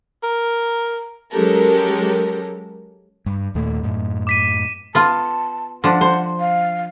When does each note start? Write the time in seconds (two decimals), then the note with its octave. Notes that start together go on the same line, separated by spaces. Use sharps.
0.23 A#4
1.32 F#3 G#3 C#4 G4 A4 A#4
3.26 G2
3.55 D#2 A#2 A3
3.83 F#2 A2
4.27 D6 B6 D#7
4.95 B3 F4 A5
5.84 F3 D4 F#5
6.01 C5
6.40 F5